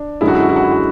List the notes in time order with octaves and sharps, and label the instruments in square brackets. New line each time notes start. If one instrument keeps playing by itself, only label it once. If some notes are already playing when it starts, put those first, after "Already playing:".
Already playing: [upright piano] D4
F#2 D3 G#3 E4
F#4
E4
F#4
E4
F#4
E4
F#4